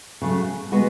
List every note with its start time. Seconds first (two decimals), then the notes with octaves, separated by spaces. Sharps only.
0.22 C#3 F#3 A3
0.72 G#3 B3 F#4 B4